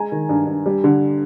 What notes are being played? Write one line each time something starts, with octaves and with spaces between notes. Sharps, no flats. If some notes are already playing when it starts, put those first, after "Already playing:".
Already playing: G#3 G#5 A#5
D#3
G2
G2
G3
D3